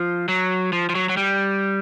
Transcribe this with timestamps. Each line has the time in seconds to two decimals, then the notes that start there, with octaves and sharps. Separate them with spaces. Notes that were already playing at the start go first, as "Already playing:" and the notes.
Already playing: F3
0.28 F#3
0.73 F3
0.90 F3
0.95 F#3
1.09 F#3
1.17 G3